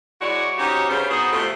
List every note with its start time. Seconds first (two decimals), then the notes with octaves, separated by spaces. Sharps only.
0.21 G#3 E4 F#4 C#5 D5
0.57 C#4 D#4 F#4 G4 C5 C#5
0.89 G2 C#3 B3 C#4 C5
1.10 B3 D#4 F#4 G#4 C5
1.32 F2 C3 F3 A3